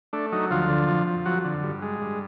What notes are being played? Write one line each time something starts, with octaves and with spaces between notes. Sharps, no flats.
A3 D4
F#3 D#4
D2 F3 F4
D3
F2
F3
F2 F#3 F#4
D3
G2
G#3
G2